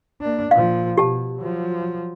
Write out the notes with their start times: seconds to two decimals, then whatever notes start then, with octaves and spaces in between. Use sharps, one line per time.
0.21 A#3 D4
0.51 A#2 F3 F5
0.98 B2 G4 A5
1.37 F3 F#3